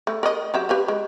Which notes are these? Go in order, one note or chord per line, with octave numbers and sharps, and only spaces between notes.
A3
A#4 D5 D#5
F#3 G4 E5
G4 B4 F5
G#3